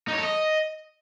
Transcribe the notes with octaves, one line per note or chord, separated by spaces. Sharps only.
D#4
C#5
A4
D#5